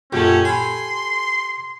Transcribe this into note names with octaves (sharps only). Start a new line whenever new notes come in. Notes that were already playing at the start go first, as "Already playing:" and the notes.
A#1 F#2 C#4 G4 A4
G#5 B5 C6